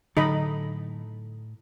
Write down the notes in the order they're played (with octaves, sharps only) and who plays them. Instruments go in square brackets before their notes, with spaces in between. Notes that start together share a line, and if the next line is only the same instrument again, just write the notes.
[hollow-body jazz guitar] A2 A4 [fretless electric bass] D3 F#3 [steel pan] D#4 D#5 B5